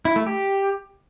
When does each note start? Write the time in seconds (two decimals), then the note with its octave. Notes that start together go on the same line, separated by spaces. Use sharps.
0.05 E4
0.16 A3
0.26 G4